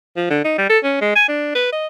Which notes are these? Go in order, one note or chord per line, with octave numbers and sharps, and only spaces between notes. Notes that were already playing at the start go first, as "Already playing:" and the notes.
F3
D3
D#4
G3
A4
C#4
G#3
G#5
D4
B4
D#5